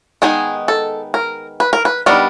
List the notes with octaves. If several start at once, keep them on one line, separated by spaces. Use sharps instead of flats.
D#3 G#3 B3 D#4 G#4
A4
A#4
B4
A#4
B4
D#3 G3 B3 D4 A#4